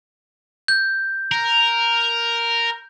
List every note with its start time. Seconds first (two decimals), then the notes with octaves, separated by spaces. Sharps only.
0.68 G6
1.32 A#4